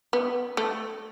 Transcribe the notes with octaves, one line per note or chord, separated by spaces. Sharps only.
B3
A3